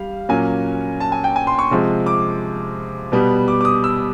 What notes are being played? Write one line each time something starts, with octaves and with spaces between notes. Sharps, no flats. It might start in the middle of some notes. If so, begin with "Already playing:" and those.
Already playing: G3 F5
A#2 F#3 A#3 C#4 G#5
A5
G#5
G5
G#5
C6
C#6
C3 F3 G#3
D6
B2 G3 B3
D6
D6
D#6
E6